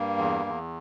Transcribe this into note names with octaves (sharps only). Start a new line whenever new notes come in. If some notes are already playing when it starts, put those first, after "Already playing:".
Already playing: G2 A#3
E2
E2